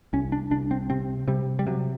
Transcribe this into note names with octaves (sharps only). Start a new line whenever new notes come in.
C2 C#4
D4
C2 D4
C4
C3 C4
C3 G3
G3
C3 F#3